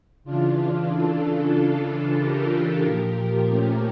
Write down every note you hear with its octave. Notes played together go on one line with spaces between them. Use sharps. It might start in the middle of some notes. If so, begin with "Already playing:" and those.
C#3 E3 D4 F4
F4 A4
F4 A4
G4 A#4
A#2 F3
A3 C#4